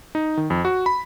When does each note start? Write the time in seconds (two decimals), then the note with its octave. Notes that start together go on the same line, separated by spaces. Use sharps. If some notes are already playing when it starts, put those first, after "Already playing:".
0.15 D#4
0.37 D#3
0.50 F2
0.65 F#4
0.86 B5